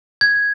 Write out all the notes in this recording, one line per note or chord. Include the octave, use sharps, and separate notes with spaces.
G#6